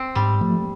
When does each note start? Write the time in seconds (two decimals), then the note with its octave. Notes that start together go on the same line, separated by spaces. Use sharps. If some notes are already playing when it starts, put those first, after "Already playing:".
Already playing: C4
0.15 G#2 G3
0.41 F3 A3